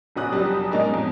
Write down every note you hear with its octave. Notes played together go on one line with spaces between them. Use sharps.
F1 B2 C#4 D#6 F#6
F#1 F#3 G3 D4 G4 A5
G#3 C#4 D#4 A#4 D5
F2